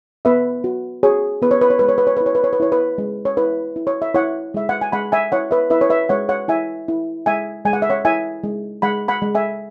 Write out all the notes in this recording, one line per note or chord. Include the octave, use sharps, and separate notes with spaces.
B3 B4 E5
F#4
F#4 G#4 C#5
B3 B4
C#5
B4
C#5
G#3 B4
C#5
B4
C#5
E4 B4
C#5
B4
C#5
B4
E4 C#5
B4
G#3
C#5
E4 B4
E4
C#5
E5
E4 C#5 F#5
G#3 E5
F#5
G#5
G#3 F#5 B5
E5 G#5
E4 C#5 F#5
B4 E5
E4 B4 E5
C#5
B4 E5
G#3 C#5 F#5
C#5 F#5
E4 E5 G#5
E4
G#3 E5 G#5
G#3 G#5
F#5
E5
C#5 F#5
E4 E5 G#5
G#3
G#3 F#5 B5
F#5 B5
G#3
E5 G#5